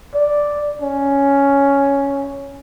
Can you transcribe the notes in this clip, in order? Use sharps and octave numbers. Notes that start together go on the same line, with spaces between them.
D5
C#4